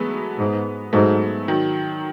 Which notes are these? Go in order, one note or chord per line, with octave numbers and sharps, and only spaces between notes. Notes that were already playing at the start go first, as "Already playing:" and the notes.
Already playing: E3 F#3 G#3 A3 B3
G#2
G#2 F#3 A3
D#3 F#3